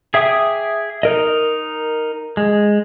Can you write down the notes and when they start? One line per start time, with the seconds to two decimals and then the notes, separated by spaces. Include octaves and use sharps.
0.14 G#4 E5 G5 D6 D#6
1.03 D#4 A#4 D#5
2.37 G#3